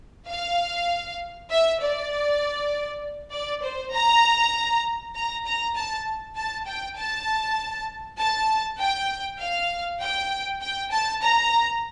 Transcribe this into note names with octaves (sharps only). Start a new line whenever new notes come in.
F5
E5
D5
D5
C5
A#5
A#5
A#5
A5
A5
G5
A5
A5
G5
F5
G5
G5
A5
A#5